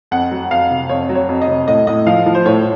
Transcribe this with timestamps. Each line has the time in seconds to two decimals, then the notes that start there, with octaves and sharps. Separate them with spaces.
0.11 F2 F#5
0.31 F#3
0.51 F2 F5
0.71 C3
0.89 F2 C#5
1.09 F#3
1.15 C#5
1.29 F2
1.42 D#5
1.48 C3
1.68 A2 D#5
1.87 A2 D#5
2.07 F3 F5
2.26 F3
2.35 C5
2.46 A2 C#5